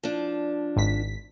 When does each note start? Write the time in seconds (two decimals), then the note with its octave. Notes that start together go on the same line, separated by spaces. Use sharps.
0.03 F3 D4
0.76 G#1 B6